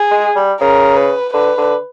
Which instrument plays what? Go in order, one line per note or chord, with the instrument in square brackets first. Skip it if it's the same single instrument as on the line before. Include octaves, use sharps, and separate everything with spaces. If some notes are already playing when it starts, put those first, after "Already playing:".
Already playing: [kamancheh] G#4
[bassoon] G#3
G3
[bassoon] C#3 [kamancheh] A#4
[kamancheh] B4
[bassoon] D3 [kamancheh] B4
[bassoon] D3